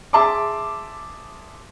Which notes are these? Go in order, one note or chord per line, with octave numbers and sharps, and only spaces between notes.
G#4 E5 A5 C6 D6